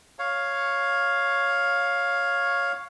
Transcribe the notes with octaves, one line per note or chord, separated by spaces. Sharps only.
C#5 F5